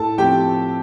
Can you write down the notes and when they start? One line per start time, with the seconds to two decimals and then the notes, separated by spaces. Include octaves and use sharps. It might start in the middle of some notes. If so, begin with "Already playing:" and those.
Already playing: A2 A4 A5
0.18 F3 A3 C4 G4 G5